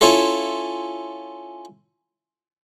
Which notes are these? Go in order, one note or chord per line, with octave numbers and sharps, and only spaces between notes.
C#4 E4 F4 A4